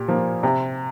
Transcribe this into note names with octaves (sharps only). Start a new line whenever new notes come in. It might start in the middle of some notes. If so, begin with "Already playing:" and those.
Already playing: A#2 G4
F3 A#3
C3